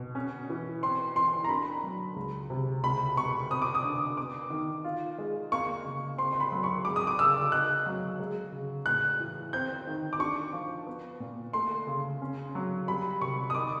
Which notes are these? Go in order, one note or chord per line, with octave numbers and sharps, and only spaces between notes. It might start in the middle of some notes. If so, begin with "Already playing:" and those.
Already playing: B2
C#4
E3
C4 C6
E3 C6
A#5
D4 B5
F#3
C#2
C3
C#2 B5
B2 C#6
C4 D#6
D6
D#6
D3
B3 D6
D#3
F4
G#3
A#3 C#6
C#3
C4 C6
C6
B5
F#3
C#6
G#3 D6
D#6
D6
C#3 E6
D#4 F#6
F#3
G#3
C#3
A2 F#6
E3
C4 G6
D#3
D6
D4 C#6
F3
B3
A#2
A3 C6
C#3
C#4
F#3
G3 B5
C3 C#6
D#6
D#4 D6